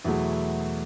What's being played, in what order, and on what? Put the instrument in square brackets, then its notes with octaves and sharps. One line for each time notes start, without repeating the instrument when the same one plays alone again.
[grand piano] E2 B2 F#3 A3 E4 G#4